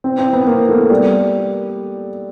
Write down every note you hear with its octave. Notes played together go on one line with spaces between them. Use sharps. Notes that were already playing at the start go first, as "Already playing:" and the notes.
C4
C4
B3
A#3
A3
G3